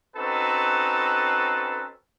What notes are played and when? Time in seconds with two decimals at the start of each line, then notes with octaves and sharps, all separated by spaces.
0.16 C4 C#4 D#4 F#4 A4 B4